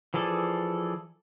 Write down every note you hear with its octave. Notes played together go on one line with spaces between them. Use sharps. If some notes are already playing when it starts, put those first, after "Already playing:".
E3 F3 G#4 A4 D5